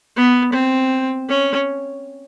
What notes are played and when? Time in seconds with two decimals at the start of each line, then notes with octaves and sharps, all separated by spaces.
0.16 B3
0.53 C4
1.29 C#4